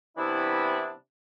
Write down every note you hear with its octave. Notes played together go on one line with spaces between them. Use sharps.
C3 E3 G3 B3 D4 E4